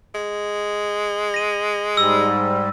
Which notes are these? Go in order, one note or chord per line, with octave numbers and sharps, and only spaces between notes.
G#3
A#6 D#7
G#2 G3 E6